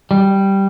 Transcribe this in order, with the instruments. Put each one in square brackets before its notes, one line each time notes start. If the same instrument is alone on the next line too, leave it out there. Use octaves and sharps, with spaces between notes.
[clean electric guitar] G3